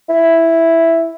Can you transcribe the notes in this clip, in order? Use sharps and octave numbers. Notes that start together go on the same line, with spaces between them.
E4